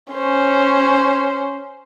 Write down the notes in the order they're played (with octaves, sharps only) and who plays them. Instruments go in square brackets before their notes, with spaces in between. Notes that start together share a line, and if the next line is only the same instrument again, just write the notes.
[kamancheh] C#4 C5